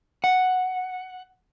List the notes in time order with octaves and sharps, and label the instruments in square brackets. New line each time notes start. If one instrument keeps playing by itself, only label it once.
[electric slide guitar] F#5